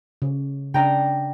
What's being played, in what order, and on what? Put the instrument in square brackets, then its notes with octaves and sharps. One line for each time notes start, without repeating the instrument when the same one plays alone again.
[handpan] C#3
[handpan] C#3 D4 [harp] G5 A#5